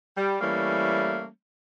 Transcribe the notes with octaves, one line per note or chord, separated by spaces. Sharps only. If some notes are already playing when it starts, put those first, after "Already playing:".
G3
E3 G3 A3 A#3 C#4